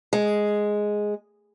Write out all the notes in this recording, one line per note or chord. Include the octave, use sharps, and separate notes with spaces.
G#3